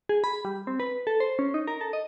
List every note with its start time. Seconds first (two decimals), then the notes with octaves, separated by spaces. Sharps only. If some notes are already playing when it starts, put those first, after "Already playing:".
0.09 G#4
0.24 B5
0.45 G3
0.67 C4
0.80 B4
1.07 A4
1.20 C5
1.39 C#4
1.54 D#4
1.67 A#4
1.81 A4
1.93 D#5